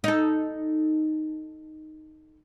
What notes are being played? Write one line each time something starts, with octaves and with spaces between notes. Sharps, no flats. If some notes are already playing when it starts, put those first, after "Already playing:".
D#4 A4